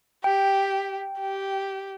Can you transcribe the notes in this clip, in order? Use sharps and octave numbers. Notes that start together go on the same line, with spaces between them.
G4 G5
G4